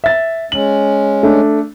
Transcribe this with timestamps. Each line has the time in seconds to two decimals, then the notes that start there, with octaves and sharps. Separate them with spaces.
0.04 E5 A6
0.52 G#3 C#4 F#7
1.23 A3 D4